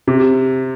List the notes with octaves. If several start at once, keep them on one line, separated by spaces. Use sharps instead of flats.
C3